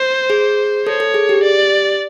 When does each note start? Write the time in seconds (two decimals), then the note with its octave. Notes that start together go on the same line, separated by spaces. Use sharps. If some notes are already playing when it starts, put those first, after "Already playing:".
Already playing: C5
0.30 G#4
0.86 A4 C#5
1.00 A4
1.14 G#4
1.29 G4
1.43 D5